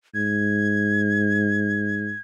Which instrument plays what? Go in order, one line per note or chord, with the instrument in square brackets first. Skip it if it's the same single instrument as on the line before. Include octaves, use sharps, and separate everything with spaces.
[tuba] G#2 [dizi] G#6